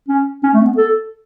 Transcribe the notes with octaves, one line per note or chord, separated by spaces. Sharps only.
C#4
C#4
A3
C#4
B3
A4